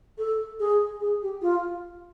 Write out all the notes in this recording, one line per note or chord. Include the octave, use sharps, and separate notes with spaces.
A4
G#4
G#4
G4
F4